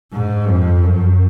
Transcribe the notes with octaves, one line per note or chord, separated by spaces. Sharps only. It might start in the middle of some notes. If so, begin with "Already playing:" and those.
G#2
F2
F#2